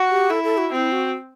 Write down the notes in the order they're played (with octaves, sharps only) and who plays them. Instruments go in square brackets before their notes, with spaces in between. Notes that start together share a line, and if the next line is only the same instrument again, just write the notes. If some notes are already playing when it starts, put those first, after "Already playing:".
Already playing: [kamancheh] F#4
[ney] G4
[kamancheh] E4 [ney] A4
[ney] A4
F#4
[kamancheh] C4 [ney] E4 F#4
[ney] F#4